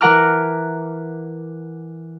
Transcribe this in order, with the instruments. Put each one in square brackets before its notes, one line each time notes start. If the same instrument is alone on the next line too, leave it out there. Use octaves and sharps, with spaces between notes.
[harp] E3 A#4 F#5 A#5 D6 F6